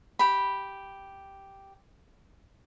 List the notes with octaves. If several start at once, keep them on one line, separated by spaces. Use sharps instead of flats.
G4 B5